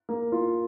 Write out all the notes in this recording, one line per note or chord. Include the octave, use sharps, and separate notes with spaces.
A#3
F4